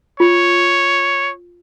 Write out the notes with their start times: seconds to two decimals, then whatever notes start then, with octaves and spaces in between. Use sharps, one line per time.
0.20 F4 C#5